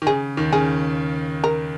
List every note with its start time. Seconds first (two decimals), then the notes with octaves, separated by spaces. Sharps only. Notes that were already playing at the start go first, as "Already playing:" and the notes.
0.02 D#3
0.07 C#3 G#4
0.37 D#2 D#3
0.53 C#3 G#4
1.44 A#4